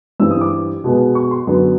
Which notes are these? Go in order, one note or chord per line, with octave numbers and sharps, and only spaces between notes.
G2 E3 G3 C4 E6
D#6
D6
B2 G#3 B3
C#6
C6
F#2 D3 F#3 B3